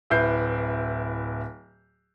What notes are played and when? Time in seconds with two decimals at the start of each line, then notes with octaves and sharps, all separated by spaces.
0.10 D1 E4 B4 G6 C7